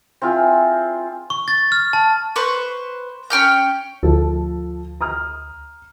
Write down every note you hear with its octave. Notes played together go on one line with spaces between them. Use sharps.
C4 E4 F4 G#4
C#6
A6
F6
A5
B4 C5 C#6
C#4 G5 F6 G6
D2 F3 A4
A#5 D#6 F6